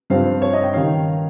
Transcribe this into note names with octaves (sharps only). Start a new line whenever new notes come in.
G2 F3 C4 F5
C#5
D#5
G5
D#3 G3 C#4 F5